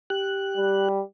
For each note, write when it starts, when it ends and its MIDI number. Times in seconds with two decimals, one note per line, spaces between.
0.10 0.89 67
0.10 0.89 90
0.57 1.02 55